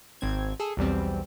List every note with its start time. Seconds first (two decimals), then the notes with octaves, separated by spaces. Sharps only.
0.21 G#1 C4 G#6
0.60 G#4 A4
0.77 B1 E2 G3 C4